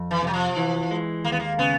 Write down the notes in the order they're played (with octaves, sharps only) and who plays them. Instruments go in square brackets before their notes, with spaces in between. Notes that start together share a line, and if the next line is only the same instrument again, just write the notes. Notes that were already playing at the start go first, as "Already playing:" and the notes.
Already playing: [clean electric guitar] F2
[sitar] E3
[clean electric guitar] C3 [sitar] F#3
[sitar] F3
[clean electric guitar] E3
G#3
[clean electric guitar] D#2 [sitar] A#3
[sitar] B3
A#3
[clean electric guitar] C#3 [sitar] B3